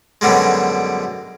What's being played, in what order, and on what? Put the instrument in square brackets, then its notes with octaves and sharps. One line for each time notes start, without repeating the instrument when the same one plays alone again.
[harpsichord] F#2 B2 D3 G3 G#3